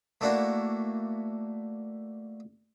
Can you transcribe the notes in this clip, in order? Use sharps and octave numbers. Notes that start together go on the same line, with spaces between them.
A3 A#3 D4 E4 F#4